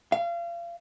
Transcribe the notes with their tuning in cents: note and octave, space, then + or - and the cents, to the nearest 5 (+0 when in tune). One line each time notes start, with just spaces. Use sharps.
F5 -30